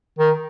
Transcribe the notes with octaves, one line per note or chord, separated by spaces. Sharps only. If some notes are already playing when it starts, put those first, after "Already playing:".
D#3